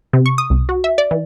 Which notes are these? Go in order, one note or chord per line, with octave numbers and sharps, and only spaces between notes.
C3
C#6
D#6
C2
F#4
E5
D5
E3